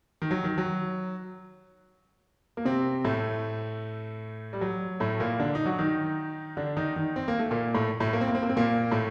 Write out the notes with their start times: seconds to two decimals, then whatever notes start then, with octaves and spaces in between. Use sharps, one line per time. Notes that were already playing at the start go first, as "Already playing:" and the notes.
0.22 D#3
0.31 F#3
0.44 D#3
0.58 F#3
2.57 A#3
2.65 C3 C4
3.05 A2 A3
4.53 G3
4.61 F#3
5.00 A2 A3
5.20 A#2 A#3
5.39 D3 D4
5.55 D#4
5.65 F#3 F#4
5.78 D#3 D#4
6.57 D3 D4
6.77 D#3 D#4
6.96 D#3 D#4
7.16 C4
7.28 A#3
7.39 A3
7.51 A#2 A#3
7.74 A2 A3
8.00 A2 A3
8.13 A#3
8.21 C4
8.27 A#3
8.35 C4
8.42 A#3
8.49 C4
8.56 A#2 A#3
8.91 A2 A3